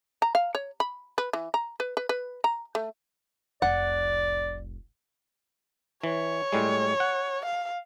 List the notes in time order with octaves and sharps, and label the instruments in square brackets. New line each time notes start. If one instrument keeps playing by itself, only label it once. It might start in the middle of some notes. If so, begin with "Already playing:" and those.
[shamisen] A#5
F5
C#5
B5
B4
E3
A#5
B4
B4
B4
A#5
A3
[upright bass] F1 C2 [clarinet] D5 [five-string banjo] F#5
[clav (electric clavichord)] E3 [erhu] C#5
[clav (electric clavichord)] A2 G3 G#3
F#5
[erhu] F5